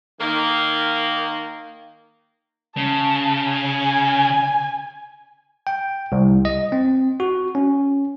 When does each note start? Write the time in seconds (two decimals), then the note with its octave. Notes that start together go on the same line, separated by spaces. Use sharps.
0.21 D#3 A#3
2.77 C#3 A5
3.49 G#5
5.67 G5
6.12 C2
6.45 D#5
6.72 C4
7.20 F#4
7.55 C#4